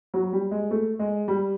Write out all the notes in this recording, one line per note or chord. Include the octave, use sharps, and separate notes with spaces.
F#3
G3
G#3
A3
G#3
G3